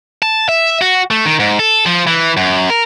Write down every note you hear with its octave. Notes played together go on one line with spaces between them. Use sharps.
A5
E5
F#4
A3
D#3
G#2
A4
F3
E3
F#2
A#4